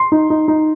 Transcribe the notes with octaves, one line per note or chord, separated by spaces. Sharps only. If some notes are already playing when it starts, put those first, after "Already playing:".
Already playing: C6
D#4
D#4
D#4